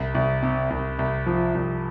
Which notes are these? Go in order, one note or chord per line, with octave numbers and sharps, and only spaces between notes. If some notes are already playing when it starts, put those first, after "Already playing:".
Already playing: C2
C2
C3
C2
C2
F3
C2